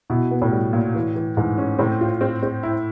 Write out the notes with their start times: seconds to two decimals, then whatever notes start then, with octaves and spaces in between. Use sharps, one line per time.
0.10 B2 E4
0.31 B3
0.42 A2
0.52 G3
0.73 A#2
0.95 E3
1.15 E3
1.37 G#2 E3
1.58 C#4
1.79 A2 C4
2.01 F4
2.21 C4
2.43 C4
2.63 E4